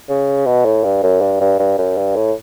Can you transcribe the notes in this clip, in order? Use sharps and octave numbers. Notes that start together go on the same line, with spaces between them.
C#3
B2
A2
G2
F#2
G2
G2
G2
F#2
G2
A2